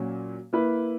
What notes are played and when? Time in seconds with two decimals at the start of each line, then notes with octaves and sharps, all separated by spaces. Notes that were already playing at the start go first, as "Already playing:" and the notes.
Already playing: A#2 F#3 C#4
0.53 A#3 E4 B4